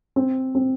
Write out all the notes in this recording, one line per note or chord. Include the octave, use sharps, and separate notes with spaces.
C4
C4